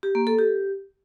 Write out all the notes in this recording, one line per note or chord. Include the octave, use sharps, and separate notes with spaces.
G4
A#3
A4
G4